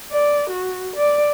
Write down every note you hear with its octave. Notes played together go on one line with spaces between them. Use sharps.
D5
F#4
D5